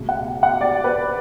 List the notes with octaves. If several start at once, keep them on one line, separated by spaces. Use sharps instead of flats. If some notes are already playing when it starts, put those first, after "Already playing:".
Already playing: C#2 B2 A3
F#5
F#5
D5
B4